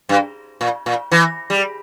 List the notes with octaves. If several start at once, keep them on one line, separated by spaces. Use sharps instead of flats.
G2
A#2
A#2
E3
G3